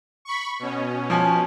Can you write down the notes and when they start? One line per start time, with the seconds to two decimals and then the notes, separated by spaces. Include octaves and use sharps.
0.25 B5 C#6
0.59 B2 C#4
1.10 F3 G#5